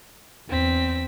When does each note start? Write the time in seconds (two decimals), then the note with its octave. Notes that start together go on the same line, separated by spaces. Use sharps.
0.49 E2 C4 B6